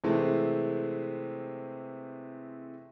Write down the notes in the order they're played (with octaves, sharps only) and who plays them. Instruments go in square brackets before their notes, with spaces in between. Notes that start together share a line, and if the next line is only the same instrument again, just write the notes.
[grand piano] C3 E3 G#3 A3 C4